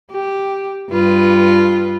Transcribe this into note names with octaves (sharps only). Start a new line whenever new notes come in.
G4
G2 F4 B4